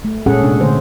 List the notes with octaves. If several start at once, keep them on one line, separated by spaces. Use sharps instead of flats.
A3
A#2 G#3 C#4 G#4 A4 F#5
C3 D4
D3 A3 C5